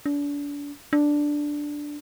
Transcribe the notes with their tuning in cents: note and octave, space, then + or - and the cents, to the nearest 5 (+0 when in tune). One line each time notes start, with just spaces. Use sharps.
D4 -35
D4 +0